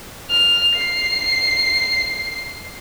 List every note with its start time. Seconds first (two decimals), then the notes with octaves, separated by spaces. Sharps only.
0.30 F6
0.75 C7